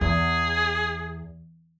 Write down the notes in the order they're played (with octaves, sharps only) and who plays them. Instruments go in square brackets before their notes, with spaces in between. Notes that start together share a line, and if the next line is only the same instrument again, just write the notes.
[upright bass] E2 [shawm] G#4